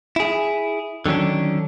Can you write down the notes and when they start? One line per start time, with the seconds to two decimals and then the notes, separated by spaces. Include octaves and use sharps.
0.16 E4 G#4
1.06 D3 D#3 F#3 C#4 D4